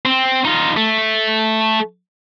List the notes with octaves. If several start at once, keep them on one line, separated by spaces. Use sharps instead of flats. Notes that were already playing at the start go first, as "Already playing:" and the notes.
C4
D#4 F4
A3